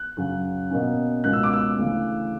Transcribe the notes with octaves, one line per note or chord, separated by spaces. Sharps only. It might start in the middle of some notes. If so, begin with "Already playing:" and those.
Already playing: F#6
F#2 C#3 F#3 C#4
B2 A#3 C#4
C#2 B2 A#3 C#4 F#6
E6
D6
E6
D2 C#3 E3